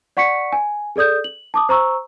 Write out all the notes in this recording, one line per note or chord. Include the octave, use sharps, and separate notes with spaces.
D5 F#5 C#6 B6 C#7
G#5
G#4 A4 D5 D#6 G6
F#7
A5 D6 D#6
C5 A#5 C#6 E6